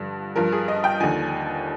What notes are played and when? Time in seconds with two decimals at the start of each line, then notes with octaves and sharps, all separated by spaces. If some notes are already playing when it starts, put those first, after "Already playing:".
Already playing: G2 D3 F3
0.36 G2 F3 A#4
0.52 G#4
0.68 D#5
0.84 G5
1.00 D#2 D3 F3 G#5